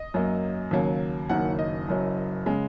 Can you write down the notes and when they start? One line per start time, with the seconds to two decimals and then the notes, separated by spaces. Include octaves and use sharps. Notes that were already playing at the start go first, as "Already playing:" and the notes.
Already playing: D#5
0.14 F#2 F#3 A#3
0.71 D#2 C#3 F#3 A#3
1.29 F#1 F#2 D#3 F#3 A#3 F#5
1.59 D#5
1.88 F#1 F#2 F#3
2.46 C#3 G#3